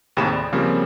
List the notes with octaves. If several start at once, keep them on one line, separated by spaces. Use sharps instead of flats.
D#2 A2 C3 G#4 B5 E7
D5
C#3 F3 G3 A#3 C4